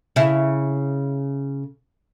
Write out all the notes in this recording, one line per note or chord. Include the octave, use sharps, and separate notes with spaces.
C#3 E4